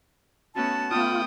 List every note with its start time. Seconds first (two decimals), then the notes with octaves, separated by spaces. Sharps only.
0.55 A3 B3 C#4 F#4 A5
0.91 A3 B3 F4 G5 D#6